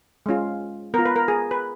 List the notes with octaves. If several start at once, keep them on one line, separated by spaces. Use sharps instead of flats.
G#3 C#4 F4
B3 F4 A#4
B4
A#4
G#4
B4